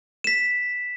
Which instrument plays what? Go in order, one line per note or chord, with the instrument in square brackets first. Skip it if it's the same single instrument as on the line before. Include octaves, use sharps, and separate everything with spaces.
[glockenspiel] B6 E7